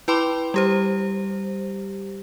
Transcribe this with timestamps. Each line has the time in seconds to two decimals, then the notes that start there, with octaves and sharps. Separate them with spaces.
0.08 E4 B4 G5 B5 C6 D6
0.54 G3 G4 C5